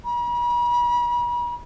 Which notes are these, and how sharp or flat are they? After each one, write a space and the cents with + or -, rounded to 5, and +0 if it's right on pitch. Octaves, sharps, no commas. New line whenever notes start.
B5 -45